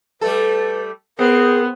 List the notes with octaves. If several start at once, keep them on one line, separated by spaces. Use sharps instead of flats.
G3 A3 A4 B4
B3 C4 G#4 A#4